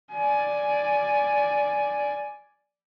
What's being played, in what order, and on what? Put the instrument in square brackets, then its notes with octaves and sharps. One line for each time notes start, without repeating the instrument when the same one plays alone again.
[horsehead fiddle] D5 G#5